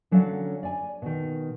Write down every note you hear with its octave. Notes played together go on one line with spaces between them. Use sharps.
D3 F#3 C#4 D5 F5
D5 G#5
B2 D#3